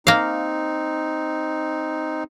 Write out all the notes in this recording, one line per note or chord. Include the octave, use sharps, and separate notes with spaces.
A#3 C4 D#4 F5